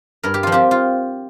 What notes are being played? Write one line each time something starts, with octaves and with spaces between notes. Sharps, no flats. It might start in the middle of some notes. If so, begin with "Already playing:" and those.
G2 A#4
G4
F3 F4
C4 G4
F4